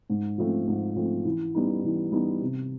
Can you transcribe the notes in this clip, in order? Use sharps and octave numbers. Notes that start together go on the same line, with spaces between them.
G#2
F3 A3 C4
G#2
F3 A3 C4
E3
G3 B3 D#4
E3
G3 B3 D#4
C3